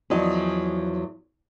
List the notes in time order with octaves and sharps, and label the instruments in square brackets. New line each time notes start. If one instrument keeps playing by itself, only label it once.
[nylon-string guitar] E2 F3 F#3 D#5